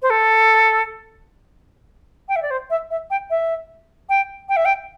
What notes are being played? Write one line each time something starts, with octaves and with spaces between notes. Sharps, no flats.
C5
A4
G5
E5
D5
C5
E5
E5
G5
E5
G5
G5
E5
G5